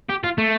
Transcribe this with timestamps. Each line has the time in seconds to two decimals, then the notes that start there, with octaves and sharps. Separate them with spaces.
0.09 G4
0.24 F4
0.38 A3